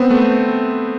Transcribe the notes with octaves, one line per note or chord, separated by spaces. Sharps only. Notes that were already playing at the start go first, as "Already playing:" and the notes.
Already playing: B3 C4
A3